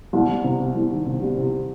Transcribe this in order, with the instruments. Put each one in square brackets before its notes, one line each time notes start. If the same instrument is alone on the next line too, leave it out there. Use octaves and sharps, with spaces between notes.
[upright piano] C2
G3
C3
C3
C2
D#3
C3
G3
C3